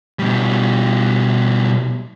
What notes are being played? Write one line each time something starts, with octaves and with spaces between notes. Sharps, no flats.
B2 G3